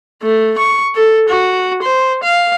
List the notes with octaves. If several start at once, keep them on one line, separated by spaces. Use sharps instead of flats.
A3
C#6
A4
F#4
C5
F5